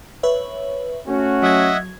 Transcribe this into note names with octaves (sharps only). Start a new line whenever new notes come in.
B4 C#5 E5
A3 C#4 F#4
F#3 D#5 E5 F#5 G#6